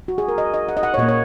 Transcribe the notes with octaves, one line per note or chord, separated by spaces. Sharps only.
F#4
G#4
A#4
D#5
D#5
F#5
D#5
F#5
C#5
A#2 A#3 D#5
C#5